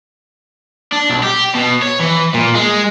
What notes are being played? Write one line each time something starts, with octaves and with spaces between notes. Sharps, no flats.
D4
B1
G4
B2
C#5
E3
A#2
G#3